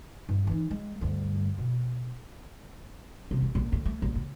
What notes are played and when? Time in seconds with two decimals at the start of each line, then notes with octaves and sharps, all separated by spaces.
0.29 G2
0.47 E3 D#4
0.71 G#3
1.01 D2 G2
1.58 B2
3.31 C3
3.42 A1
3.55 A#1
3.72 D2
3.85 A3
4.02 A#1
4.15 C#3